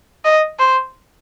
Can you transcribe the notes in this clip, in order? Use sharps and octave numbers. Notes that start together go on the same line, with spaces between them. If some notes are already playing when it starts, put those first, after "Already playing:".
D#5
C5